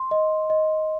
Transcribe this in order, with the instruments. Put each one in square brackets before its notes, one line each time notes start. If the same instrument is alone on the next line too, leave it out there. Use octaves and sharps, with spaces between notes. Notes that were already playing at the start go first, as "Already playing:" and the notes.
Already playing: [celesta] C6
D#5
D#5